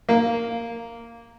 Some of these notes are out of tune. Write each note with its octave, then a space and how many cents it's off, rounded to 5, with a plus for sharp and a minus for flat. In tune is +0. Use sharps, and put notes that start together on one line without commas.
A#3 -5